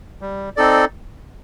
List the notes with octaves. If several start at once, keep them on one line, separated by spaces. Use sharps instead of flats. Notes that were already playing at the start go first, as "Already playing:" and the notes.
G3
C4 D#4 A4 D5